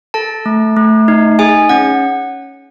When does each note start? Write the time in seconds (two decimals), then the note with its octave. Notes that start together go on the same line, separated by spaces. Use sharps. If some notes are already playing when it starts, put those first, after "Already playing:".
0.14 A4 A5
0.46 A3
0.77 A3
1.08 D#4
1.39 G#4 G#5
1.69 C#4 F#5